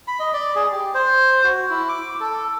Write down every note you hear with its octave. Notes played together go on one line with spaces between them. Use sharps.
B5
D#5
D5
G#4
G4
C5
F#4
E4
D6
A4